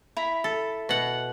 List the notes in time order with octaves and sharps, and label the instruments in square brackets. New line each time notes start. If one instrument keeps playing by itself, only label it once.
[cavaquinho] E4 A#5 B5
[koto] A4
B2 F#5